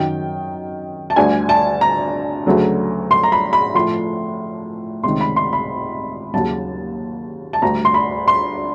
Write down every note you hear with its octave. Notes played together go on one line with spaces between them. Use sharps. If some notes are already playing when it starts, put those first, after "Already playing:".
Already playing: F#2 D#3 F#3 G5
A5
D2 D3 G3 G#5
A5
A#5
D2 C#3 F#3 A3
C6
A#5
B5
B5
A2 F3 A3 C6
C#2 C3 D#3 C6
B5
C6
B5
D#2 C#3 F#3 A5
A5
D2 D3 G3 A#5
C6
B5
C6